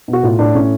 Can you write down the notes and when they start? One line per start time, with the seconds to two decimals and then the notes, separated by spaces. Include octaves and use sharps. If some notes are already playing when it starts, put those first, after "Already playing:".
0.08 B2
0.13 F#4
0.23 A2 F4
0.39 A2 D4
0.55 A2 C#4